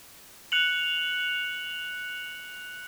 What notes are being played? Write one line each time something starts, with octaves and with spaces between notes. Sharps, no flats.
F#6 C#7 F7 F#7